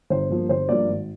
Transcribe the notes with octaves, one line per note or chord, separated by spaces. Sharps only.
G1 C5
G2 F3 A#3
G1 C5
G2 F3 A#3 D5
G#1